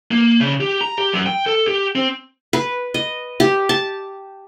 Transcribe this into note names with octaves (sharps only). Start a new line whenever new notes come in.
A#3
C#3
G4
A#5
G4
F#2
G5
A4
G4
C4
B4
D#5
G4
A5